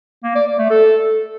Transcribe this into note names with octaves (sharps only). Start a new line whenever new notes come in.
A#3
D5
D5
A3
A4